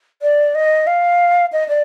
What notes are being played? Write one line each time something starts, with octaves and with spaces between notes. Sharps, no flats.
D5
D#5
F5
D#5
D5